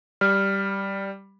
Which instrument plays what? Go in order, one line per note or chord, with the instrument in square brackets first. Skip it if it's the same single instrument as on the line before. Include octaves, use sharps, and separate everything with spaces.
[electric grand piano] G3 [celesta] F6